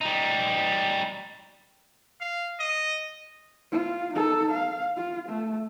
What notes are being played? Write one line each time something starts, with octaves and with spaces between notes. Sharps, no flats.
G3 D#4
F5
D#5
F4
D#4 A4
F5
F4
A3